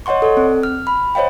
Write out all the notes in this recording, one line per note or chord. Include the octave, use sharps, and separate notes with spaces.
C#5 D#5 F#5 C6 C#6
A4 D5
C4
F6
B5
C5 C#5 D#5 F5 G5